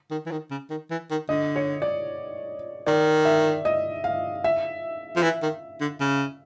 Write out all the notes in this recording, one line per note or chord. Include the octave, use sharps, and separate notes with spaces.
D#3
E3
D#3
C#3
D#3
E3
D#3
D3 D#5
C#5
D5
D#3 D5
E5
D#5
F5
E5
F3
E3
D#3
D3
C#3